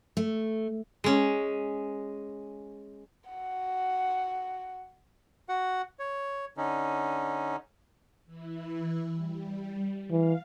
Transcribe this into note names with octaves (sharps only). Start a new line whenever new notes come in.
A3
G#3 C#4
F#4 F#5
F#4 F#5
C#5
D3 C#4 D#4
E3 E4
G3
E3 F5